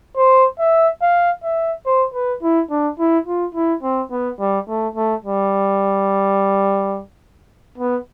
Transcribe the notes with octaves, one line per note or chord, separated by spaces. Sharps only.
C5
E5
F5
E5
C5
B4
E4
D4
E4
F4
E4
C4
B3
G3
A3
A3
G3
B3